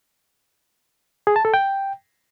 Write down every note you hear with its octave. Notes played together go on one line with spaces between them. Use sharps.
G#4
A5
A4
G5